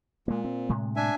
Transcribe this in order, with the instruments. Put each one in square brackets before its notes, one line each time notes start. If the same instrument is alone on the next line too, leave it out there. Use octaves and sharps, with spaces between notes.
[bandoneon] A#2 [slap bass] G#3 A#3
[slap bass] C4
A2 C3 G#3
[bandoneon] D4 E5 G#5